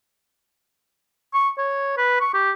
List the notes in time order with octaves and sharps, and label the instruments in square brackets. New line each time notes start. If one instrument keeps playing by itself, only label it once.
[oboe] C#6
C#5
B4
C#6
G4